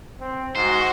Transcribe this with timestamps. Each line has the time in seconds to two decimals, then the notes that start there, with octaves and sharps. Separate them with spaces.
0.21 C4
0.55 G#2 F#4 C5